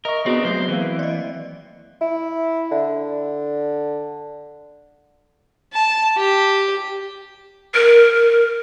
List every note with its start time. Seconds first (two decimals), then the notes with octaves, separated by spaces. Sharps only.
0.05 A#4 D#5 E5 C#6
0.26 B3 C4 D4 F#4 G#4 B4 C#5
0.45 F#3 A3 C5
0.68 E3 A#3 C4 B4
0.99 D5 D#5
2.01 E4
2.72 D3
5.73 A5
6.17 G4
7.75 A#4